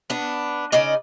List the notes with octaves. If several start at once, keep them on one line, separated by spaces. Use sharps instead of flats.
B3 D4
C#3 D#4 D5 D#5